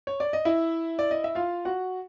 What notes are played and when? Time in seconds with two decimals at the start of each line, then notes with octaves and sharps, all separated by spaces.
0.07 C#5
0.20 D5
0.33 D#5
0.45 E4 E5
0.99 D5
1.11 D#5
1.24 E5
1.35 F4 F5
1.65 F#4 F#5